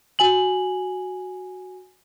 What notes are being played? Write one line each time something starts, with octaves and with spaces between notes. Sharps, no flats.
F#4 G#5 F#7